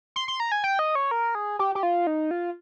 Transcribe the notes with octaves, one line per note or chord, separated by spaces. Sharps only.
C6
C6
A#5
G#5
G5
D#5
C#5
A#4
G#4
G4
G4
F4
D#4
F4